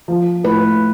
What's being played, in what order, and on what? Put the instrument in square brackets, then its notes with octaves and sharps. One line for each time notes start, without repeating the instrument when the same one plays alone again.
[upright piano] F3
[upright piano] A2 [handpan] B4